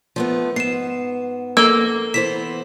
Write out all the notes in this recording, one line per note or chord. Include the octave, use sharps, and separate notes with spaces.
F3 A3 B3
G#2 B3 C7 E7
A#3 A4 E6
E3 B3 C5 B6 E7